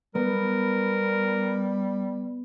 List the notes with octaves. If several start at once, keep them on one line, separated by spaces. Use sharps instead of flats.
G3 B3 A#4